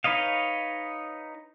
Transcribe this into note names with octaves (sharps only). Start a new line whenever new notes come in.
D#4 B4 C#5 D#5 F5